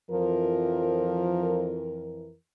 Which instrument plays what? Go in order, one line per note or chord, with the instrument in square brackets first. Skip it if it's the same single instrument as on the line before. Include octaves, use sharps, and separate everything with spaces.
[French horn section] F2 E3 A#4 [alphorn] F3